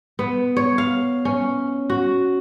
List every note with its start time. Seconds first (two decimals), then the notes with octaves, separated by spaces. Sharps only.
0.19 B3
0.57 C#5
0.78 F5
1.25 C#4
1.90 F#4